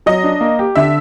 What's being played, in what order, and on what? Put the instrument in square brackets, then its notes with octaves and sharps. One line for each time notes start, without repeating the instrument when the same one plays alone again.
[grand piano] F#3 [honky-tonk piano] D#5
[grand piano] D4
A#3
G4
[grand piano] D3 [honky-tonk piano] E5